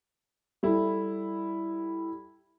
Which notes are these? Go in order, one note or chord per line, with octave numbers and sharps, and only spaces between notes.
G3 E4 A4